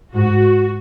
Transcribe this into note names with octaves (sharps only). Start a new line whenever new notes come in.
G#2 F#4